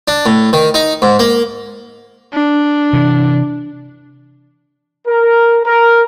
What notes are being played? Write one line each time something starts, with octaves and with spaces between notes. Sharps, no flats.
D4
A2
D#3
D#4
G#2
A#3
D4
C3 E3
A#4
A#4